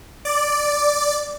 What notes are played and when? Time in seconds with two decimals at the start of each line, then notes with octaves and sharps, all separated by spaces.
0.25 D5